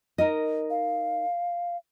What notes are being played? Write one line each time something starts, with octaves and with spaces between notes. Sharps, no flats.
D#4 A#4 D#5
F5